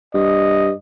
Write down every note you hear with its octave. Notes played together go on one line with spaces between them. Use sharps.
G2 D#5